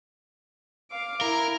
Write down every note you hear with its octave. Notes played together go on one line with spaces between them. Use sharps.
F5 D6
E4 A#4